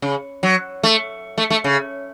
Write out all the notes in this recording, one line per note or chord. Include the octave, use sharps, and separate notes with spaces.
C#3
F#3
A3
A3
A3
C#3